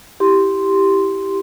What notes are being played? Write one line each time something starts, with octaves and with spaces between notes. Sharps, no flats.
E4 G4 C6